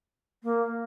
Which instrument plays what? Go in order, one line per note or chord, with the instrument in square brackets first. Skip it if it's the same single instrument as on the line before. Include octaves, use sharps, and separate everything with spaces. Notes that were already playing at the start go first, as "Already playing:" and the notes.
[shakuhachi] A#3